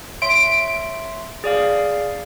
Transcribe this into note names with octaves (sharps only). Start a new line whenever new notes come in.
C#5 E5 C6 D7
G#4 D5 F5